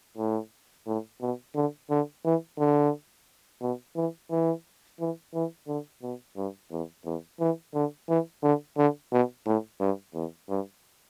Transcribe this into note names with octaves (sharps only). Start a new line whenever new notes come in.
A2
A2
B2
D3
D3
E3
D3
B2
E3
E3
E3
E3
D3
B2
G2
E2
E2
E3
D3
E3
D3
D3
B2
A2
G2
E2
G2